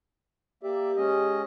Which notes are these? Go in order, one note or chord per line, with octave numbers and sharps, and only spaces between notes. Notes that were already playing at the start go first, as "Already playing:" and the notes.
A#3 G4 D5 E5
G#3 C#4 D#5